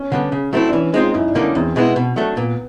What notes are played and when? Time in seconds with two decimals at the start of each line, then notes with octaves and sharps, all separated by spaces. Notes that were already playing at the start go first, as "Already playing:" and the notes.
Already playing: C#4
0.12 D3 G3 B3
0.32 C#3
0.53 F#3 A3 C4 E4
0.67 D4
0.73 E3 C#4
0.93 G#3 C4 D#4 F4
1.14 F#2 E4
1.28 D4
1.35 D3 G3 A#3 D#4
1.42 C#4
1.55 E2 C4
1.76 B2 G#3 B3 E4
1.96 B2
2.16 F#3 A3 D4
2.37 A#2 B3